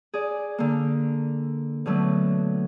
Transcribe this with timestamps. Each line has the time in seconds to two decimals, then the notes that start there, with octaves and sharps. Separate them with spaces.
0.14 G#4 D5
0.58 D3 A#3
1.86 B2 D3 F#3 A3